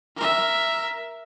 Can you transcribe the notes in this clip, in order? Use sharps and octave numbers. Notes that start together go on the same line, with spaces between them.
A#4 E5